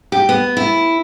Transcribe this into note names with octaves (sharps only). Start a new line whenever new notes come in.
G4
B3
E4